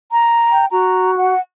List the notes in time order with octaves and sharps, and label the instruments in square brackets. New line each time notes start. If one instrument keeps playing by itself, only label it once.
[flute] A#5
[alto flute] G5
[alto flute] F#4 [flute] A#5
[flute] F#5